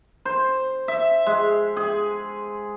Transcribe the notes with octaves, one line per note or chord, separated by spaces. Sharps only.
C5
E5
G#3
G#4